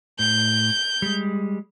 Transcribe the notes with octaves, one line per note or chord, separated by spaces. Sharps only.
A2 G6
G3 G#3